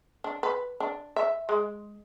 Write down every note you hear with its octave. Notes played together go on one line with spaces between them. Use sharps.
D4
B4
D4
E5
G#3